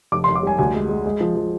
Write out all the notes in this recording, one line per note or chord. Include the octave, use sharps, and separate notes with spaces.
F1 D6
C6
F1
D6
G3 G#5
D2 G#5
G#3
G#3
G#3
F3
F3